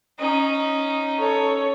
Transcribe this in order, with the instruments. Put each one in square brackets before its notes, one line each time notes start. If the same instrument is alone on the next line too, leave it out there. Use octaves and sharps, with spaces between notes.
[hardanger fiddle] C#4 D#4
[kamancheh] A4 C#5